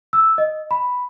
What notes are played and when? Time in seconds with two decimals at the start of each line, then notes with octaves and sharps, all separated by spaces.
0.13 E6
0.38 D#5
0.71 B5